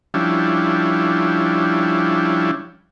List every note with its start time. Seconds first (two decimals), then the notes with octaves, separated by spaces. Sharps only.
0.14 F3 G3 C#4 D4 E4